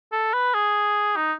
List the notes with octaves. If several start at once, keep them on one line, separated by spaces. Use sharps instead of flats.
A4
B4
G#4
D#4